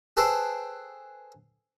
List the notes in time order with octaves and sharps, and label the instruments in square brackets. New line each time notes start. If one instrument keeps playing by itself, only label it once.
[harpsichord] G#4 A4 B4 C5 G5